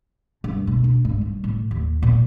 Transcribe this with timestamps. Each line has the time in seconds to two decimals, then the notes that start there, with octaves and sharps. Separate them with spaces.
0.44 G2
0.67 B2
0.84 D4
1.05 G#2
1.21 G2
1.44 A2
1.71 D#2
2.02 A#2